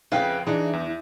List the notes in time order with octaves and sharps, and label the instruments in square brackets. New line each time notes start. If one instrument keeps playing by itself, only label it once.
[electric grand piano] F2 C#3 [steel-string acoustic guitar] B4 F5 G5
[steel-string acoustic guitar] E3 [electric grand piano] D4 D#4 G#4
[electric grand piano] E2